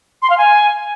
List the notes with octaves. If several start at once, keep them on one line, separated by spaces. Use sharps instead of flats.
C6
F5
G#5